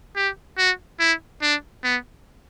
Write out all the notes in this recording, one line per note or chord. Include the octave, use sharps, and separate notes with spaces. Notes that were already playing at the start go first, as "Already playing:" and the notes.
G4
F#4
E4
D4
B3